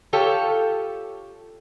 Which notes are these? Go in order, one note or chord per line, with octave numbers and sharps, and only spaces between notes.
F4 G4 A4 C#5